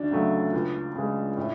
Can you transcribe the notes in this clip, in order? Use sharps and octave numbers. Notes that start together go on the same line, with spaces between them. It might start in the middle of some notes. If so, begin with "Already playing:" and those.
Already playing: D2 D4
C#3 F#3 A3
C#2
C#3 G#3
A2